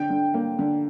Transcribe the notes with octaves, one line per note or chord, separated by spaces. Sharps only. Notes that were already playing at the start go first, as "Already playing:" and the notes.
Already playing: D3 G5
D3
A#3
D3